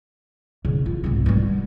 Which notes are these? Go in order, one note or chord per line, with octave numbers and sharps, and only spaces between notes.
C#3
F4
C2 G#2
G3 B3